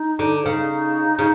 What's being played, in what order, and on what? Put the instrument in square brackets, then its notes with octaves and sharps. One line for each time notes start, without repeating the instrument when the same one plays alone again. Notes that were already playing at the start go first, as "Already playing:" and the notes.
Already playing: [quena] D#4
[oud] D3
[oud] C#3 [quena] D#4
[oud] C#3